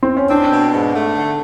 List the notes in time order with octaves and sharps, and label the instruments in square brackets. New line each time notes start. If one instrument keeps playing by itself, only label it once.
[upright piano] C4
C#4
[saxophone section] C4 [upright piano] D4
[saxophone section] B2
G#2
A3
D3